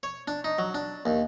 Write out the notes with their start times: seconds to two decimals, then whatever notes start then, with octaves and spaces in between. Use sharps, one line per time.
0.03 C#5
0.28 D4
0.44 D#4
0.58 F#3
0.74 D4
1.06 D#2